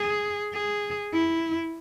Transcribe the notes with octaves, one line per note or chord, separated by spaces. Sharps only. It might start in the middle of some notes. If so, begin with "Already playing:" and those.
Already playing: G#4
G#4
E4